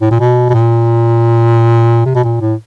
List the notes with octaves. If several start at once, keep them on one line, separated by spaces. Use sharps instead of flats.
A2
A#2
B2
B2
A#2
C3
B2
A#2
A2